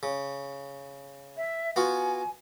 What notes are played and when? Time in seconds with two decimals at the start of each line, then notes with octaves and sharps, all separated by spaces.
0.03 C#3
1.37 E5
1.76 B3 F4 F#4 G#5